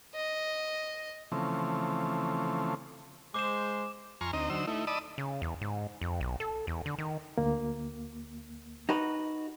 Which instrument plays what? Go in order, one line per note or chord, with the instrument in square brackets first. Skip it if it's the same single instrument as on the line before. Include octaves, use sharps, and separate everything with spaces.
[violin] D#5
[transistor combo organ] C#3 E3 F3 A3 C4
[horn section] G#3 C5 [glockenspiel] D6 E7
[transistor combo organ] F2 G#5 A#5 C6 C#6 F6
D2 C4 D#4 D#5 A#5
D3 F#3 D#4 C5 E6
A3 D#4 E4
D5 D#5 A5 B5 D#6 E6
[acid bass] C#3
E2
G#2
F2
B1
A4
E2
D3
D#3
[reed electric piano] D2 A#3
[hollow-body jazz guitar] D#4 F#4 B4